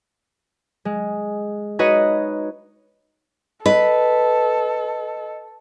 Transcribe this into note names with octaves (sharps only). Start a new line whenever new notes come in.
G#3
D#4 F#4 B4 C#5 D#5 D#7
A4 B4 D#5